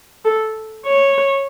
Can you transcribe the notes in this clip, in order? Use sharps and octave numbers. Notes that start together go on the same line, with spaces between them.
A4
C#5